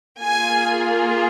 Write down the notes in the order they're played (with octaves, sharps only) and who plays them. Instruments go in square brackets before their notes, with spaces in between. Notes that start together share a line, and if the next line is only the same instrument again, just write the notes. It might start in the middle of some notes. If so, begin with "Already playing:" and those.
[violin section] A#3 F4 G#4 G#5